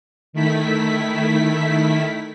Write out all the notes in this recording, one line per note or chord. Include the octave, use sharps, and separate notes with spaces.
D#3 A3 E4 B6